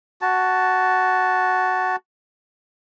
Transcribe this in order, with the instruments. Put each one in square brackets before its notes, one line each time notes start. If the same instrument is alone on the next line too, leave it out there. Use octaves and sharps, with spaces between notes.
[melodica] F#4 A5